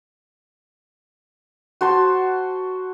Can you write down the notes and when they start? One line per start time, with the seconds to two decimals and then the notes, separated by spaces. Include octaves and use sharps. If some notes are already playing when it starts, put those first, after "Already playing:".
1.81 F#4 C5 A5 C6